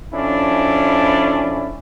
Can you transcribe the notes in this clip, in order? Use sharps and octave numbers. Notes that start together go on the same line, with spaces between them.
F2 C#4 D4 E4